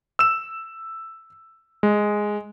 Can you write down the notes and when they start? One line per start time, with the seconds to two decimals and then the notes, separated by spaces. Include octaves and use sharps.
0.19 E6 E7
1.83 G#3